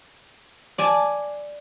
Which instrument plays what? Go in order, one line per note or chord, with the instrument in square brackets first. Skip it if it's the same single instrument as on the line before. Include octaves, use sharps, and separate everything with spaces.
[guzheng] D5 G#5 A5